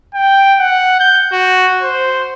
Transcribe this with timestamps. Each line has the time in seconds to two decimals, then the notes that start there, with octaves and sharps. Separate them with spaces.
0.15 G5
0.59 F#5
1.00 G6
1.33 F#4
1.82 C5